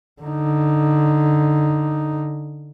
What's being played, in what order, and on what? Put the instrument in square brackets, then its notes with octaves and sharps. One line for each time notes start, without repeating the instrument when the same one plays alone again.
[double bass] D3 D#4